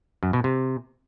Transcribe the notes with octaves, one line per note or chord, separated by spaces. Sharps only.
F#2
B2
C3